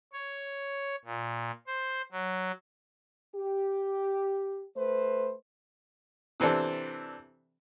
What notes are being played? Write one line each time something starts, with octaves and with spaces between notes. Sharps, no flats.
C#5
A#2
C5
F#3
G4
A3 B4 C5
C3 E3 C4 D4 A4